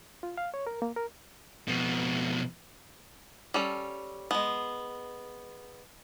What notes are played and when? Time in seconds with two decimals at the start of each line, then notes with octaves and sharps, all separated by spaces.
0.23 F4
0.38 F5
0.54 C#5
0.67 A#4
0.82 A#3
0.96 A#4
1.68 F2 B2
3.54 G3 C#4 A4
4.31 G#3 B3